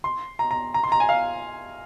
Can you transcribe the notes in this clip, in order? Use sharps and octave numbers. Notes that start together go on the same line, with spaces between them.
C6
A#5
A#5
A#5
C6
A#5
G#5
F5